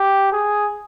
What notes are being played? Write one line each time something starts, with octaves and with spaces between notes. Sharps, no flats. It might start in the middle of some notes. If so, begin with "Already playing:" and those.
Already playing: G4
G#4